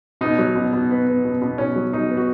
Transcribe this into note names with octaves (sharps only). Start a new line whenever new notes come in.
B2 D#4
F#3
B2
B2
B3
B3
B2
B2
B2 C#4
F#3
F#3 D#4
B3
F#4